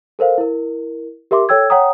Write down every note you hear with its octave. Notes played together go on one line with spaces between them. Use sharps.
A4 A#4 C5 F5
E4 A#4
G4 A#4 E5 C6 D6
A4 C#5 G5 E6 G#6
C#5 F#5 G5 A#5 D#6